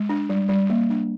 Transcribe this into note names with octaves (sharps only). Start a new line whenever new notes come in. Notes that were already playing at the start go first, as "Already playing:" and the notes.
Already playing: G#3
D4
G3
G3
A#3
D4